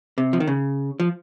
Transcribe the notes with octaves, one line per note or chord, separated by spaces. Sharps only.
C3
F3
D#3
C#3
F3